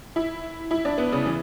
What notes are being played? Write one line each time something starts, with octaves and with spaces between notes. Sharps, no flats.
E4
E4
D4
B3
C#3
E3